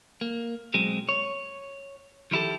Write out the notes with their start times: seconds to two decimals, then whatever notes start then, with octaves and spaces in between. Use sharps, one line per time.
0.21 A#3
0.74 B2 F#3 G#3 C4
1.09 C#5
2.31 D#3 F3 E4 G4 A4